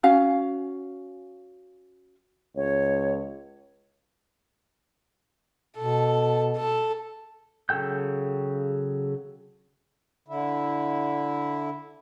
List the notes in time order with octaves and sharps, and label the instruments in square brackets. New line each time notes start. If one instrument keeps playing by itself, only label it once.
[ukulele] C#4 F#4 F5 G#5
[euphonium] C#2 [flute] C#5
[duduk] B2 [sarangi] A4
[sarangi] A4
[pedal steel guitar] C#3 F#3 A4 G5 G6
[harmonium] D3 E4